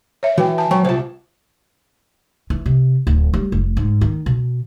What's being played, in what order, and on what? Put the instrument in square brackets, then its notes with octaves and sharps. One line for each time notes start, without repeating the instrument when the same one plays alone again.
[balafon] C#5 E5
[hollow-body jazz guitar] E3 [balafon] F#4 B4 G5
[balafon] G#5 A5
[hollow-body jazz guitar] F#3 [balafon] G5 C#6
[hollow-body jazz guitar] C2 A5 [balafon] F4 C5
[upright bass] E3
C3
D1
G3
F1
G#2
D#3
B2